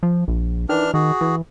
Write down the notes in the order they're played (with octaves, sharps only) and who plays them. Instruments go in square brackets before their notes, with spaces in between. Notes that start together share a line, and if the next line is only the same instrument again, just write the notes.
[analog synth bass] F3
A#1
[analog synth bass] D#3 [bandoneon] E3 D4 F6
[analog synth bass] D#3 [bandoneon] F#4 G#4
[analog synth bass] E3